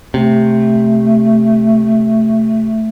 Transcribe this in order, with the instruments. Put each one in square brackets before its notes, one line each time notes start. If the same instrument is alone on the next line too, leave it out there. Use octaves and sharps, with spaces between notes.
[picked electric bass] C3 [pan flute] A3